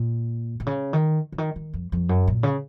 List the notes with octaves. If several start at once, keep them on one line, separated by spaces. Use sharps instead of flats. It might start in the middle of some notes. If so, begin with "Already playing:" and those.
Already playing: A#2
B2
C#3
D#3
C#3
D#3
D#3
F2
F2
F#2
A#2
C#3